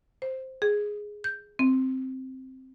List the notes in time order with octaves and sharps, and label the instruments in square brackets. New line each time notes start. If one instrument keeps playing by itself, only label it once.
[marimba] C5
G#4
G6
C4